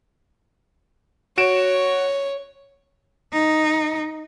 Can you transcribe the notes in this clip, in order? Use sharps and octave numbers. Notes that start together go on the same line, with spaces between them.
F#4 C#5 D7 E7
D#4